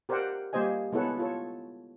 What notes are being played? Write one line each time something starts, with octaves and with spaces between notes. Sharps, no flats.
G4 A#4 C5 D5 F#5 G5
G3 A#3 G4 C5 D#5 G#5
G#3 B3 E4 A4 C#5 F#5
F4 A4 C#5